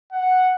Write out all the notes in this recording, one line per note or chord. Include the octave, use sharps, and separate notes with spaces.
F#5